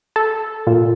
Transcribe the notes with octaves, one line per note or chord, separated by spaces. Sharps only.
A4
A#2